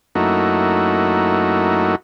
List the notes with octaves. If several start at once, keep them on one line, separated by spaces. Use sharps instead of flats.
F#2 A3 A#3 D#4 E4 F#4